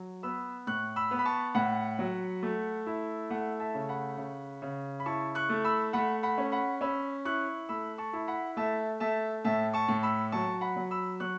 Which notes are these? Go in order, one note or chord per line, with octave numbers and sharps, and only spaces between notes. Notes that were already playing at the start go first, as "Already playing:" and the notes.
Already playing: F#3
B3 B5 E6
A2 C#6 F#6
B5 E6
B3
B5
A5 C#6
A2 F#5 B5
F#3
A3
E4
A3 F#5
E5 A5
C#3
F#5 B5
C#3
C#3
B5
E4 A5 C#6
C#6 F#6
A3
B5 E6
A3 F#5 B5
F#5 B5
C#4
F#5 B5
C#4 B5 E6
E4 C#6 F#6
A3 B5 E6
A5 C#6
E4
F#5 B5
A3 E5 A5
A3 E5 A5
A2 E5 A5
A5 C#6
A2
B5 E6
F#3 A5 C#6
F#5 B5
F#3
B5 E6
F#3 C#6 F#6